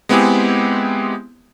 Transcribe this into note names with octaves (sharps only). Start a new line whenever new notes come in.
G#3 B3 C4 E4 G4 G#4